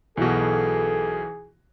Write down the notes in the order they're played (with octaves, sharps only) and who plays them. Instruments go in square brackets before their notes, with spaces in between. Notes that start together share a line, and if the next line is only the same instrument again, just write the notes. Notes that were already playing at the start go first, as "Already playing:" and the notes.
[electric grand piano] B1 B2 [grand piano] E3 F#4 [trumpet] G#4 [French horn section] A4